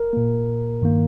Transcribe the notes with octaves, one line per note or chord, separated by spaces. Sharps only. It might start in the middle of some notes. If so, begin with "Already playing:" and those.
Already playing: A#4
A#2 A#3
G2 D#3 A#3